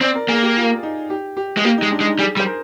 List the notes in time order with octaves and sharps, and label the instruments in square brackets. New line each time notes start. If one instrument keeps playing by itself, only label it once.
[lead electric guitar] C4 [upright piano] D5
[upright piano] A#4
[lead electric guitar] A#3 [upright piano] G#4
[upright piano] G4
F4
D#4
G4
G4
[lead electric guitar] G#3
[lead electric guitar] A#3 [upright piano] G4
[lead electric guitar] G#3 [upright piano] D#4
[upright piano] D4
[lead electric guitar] G#3
[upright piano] D#4
[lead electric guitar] G3 [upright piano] G#4
[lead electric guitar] G3
[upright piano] C5
A#4